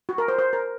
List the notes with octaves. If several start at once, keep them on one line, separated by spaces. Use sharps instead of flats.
F#4
A#4
C5
C5
A#4